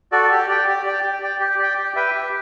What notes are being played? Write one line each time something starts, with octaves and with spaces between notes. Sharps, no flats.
F#4 A4 D5
G4
D5 G5
G4
D5 G5
G4
D5 G5
G4
D5 G5
G4
B4 E5 G5
G4